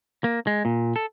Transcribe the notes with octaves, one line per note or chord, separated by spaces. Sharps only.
A#3
G#3
A#2
A4